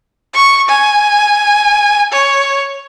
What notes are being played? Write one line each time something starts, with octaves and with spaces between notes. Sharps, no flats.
C#6
G#5
C#5